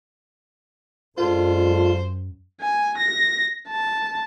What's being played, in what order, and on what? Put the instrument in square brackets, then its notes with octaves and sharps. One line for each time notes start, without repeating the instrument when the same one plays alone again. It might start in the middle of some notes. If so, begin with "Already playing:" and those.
[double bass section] F#2 [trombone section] G#3 D4 A4 [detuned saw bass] F4 [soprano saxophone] C5
[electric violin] G#5
A#6
A5